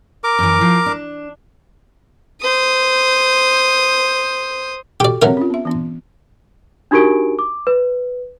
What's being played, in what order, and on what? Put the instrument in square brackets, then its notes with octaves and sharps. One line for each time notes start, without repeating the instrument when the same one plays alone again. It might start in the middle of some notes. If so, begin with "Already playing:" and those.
[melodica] A#4 D6
[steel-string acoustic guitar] F#2 E3
F3
D4
[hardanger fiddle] C5 D#6
[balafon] F#4 A4 C#6 [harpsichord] G4 D5
[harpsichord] F#3 A3 A#4 [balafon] C4 G4
[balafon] C#4 F4
B3 E5
E3 B3 D4
[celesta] D4 D#4 F#4 G4 A#4 D7
D6
B4